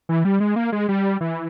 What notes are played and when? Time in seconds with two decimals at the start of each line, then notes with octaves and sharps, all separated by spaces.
0.09 E3
0.25 G3
0.40 G#3
0.56 A#3
0.72 G#3
0.89 G3
1.21 E3